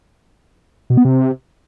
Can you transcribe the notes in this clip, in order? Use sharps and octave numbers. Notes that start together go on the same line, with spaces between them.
B2
B3
C3